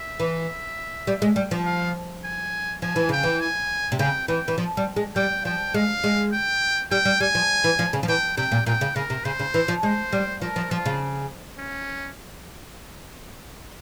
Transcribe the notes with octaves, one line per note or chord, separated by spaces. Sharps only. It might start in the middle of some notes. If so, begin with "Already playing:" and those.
Already playing: E5
E3
G3
G#3
G3
F3
F5
G#5
F3 G#5
E3
C#3 G5
E3
G#5
C3
C#3 G5
E3 G5
E3
F3
G3
G#3
G3 G5
F3 G5
G#3 F5
G#3
G5
G3 G5
G3
G3 G#5
F3
E3
F3
C#3
F3
E3 G5
C3 G5
A#2
A#2 G5
C#3
C#3 A#4
C3
C#3 C5
C#3
E3
F3
G#3 C5
G3
F3 A#4
F3
F3 F4
C#3
C#4